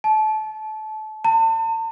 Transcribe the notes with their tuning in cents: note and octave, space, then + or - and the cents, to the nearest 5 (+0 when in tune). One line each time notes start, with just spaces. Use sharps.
A5 -25
A5 +40